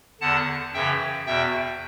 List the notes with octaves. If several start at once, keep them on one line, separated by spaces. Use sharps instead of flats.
E2 D3 F#5 A5
F#2 C#3 E3 E5 G5
E2 B2 E5 G5